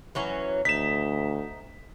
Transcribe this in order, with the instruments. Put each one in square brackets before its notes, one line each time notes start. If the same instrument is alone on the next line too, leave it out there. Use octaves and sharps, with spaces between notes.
[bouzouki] E3 F#3 C#4
[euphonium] D2 [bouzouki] D#4 [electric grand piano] B6 E7